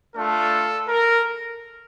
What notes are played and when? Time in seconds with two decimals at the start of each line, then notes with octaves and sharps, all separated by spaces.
0.16 A3 D4 F4 A4
0.88 A#4